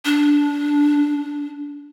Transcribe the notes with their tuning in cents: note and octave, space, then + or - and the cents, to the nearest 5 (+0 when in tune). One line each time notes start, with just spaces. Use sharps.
D4 -15